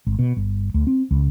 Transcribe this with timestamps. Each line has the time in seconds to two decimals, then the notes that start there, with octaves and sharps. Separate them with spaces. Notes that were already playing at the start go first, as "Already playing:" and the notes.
0.06 G#1
0.19 B2
0.36 G1
0.74 D2
0.87 C4
1.11 C#2